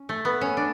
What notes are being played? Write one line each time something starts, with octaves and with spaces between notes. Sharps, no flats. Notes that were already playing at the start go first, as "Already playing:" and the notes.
Already playing: C#4
A3
B3
C#4
D4